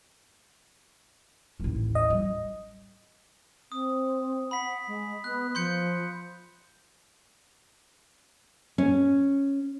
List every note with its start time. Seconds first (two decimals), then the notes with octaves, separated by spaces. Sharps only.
1.60 A1 D#2
1.95 D#5
2.10 G3
3.72 C4 D#6
4.51 F#5 B5 B6
4.87 G#3
5.24 B3 F#6
5.55 F3 C6 G6 C#7
8.78 C#4